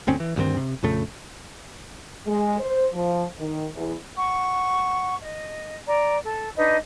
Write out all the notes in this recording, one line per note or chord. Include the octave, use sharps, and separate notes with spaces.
G1 D2 C4 C#4
E3
D2 G2 D#3 C4
C3
A#1 F2 C#3 A3
G#3
C5
F3
D#3
E2
F#5 C#6
D#5
D5 A#5
A4
D4 D#4 B4 D#5